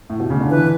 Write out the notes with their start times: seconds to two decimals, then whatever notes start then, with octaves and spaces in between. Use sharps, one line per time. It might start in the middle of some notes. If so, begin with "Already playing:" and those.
0.10 A2
0.20 B2
0.30 C#3
0.40 D3
0.50 E3 B4